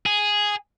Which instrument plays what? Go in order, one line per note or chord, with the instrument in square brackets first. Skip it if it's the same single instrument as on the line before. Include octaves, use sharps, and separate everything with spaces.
[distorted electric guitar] G#4